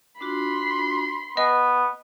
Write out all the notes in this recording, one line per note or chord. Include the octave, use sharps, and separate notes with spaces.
D4 F4 F#4 B5 C6
B3 B4 D#5 G#5